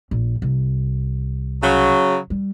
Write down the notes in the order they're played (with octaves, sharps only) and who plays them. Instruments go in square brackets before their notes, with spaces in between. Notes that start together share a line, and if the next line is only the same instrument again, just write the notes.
[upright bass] A#1
C2
[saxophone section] C#3 F#3
[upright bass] G3